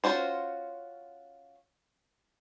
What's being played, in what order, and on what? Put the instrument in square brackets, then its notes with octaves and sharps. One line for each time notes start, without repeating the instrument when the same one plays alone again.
[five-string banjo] C#4 F4 F#4 C5